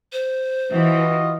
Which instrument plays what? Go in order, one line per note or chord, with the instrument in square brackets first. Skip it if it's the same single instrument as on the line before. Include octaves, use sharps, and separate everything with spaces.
[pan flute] C5
[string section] E3 [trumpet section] F4 F#4 D#5